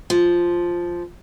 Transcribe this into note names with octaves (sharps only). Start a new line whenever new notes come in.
F3